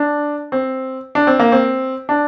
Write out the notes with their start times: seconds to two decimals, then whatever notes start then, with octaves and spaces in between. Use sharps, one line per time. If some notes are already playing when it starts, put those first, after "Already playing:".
Already playing: D4
0.52 C4
1.15 D4
1.27 C4
1.39 A#3
1.52 C4
2.09 D4